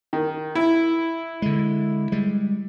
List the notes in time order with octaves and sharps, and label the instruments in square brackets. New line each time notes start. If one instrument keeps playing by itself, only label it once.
[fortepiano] D#3
E4
[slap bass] D3 G#3
G3 G#3